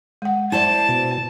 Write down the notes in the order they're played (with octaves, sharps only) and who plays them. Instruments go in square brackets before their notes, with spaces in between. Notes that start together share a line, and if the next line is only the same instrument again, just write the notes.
[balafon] G#3 F#5
[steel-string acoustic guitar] E4 C5 D5 [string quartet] A5
[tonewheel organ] B2